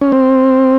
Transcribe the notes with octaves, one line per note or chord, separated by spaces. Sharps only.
C#4
C4